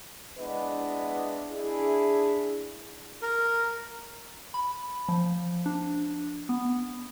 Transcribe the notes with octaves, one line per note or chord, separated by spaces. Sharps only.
G#3 B3 D4 E4 B4 D#5
D4 E4 G#4
A#4
B5
F3
D4
B3